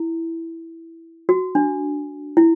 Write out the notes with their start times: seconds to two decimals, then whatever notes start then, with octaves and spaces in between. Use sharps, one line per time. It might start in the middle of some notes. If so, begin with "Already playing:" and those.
Already playing: E4
1.29 F#4
1.55 D4
2.37 E4